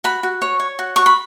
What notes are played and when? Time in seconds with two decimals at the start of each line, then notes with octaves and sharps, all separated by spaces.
0.04 F#4 B5
0.23 F#4
0.42 C#5
0.60 C#5
0.79 F#4
0.96 F#4 C#6
1.06 B5